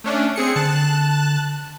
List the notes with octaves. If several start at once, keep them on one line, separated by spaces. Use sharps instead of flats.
A3 C#4 D4
C4 G#4 C#7
D3 A5 F#6